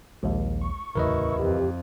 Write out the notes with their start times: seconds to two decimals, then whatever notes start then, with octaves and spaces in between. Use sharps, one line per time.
0.23 A#1 D#2 G#3
0.61 C#6
0.95 D1 A1 E2 C#3 E4 A#4 B4 D#5
1.39 F2 G4